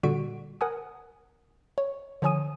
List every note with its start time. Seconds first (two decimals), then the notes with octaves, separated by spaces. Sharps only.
0.03 A#2 D3 G3 F#4 B6 D7
0.61 A#4 F#5 G#5 D#6
1.78 C#5
2.22 D3 F3 C#5 G#5 D#6 D#7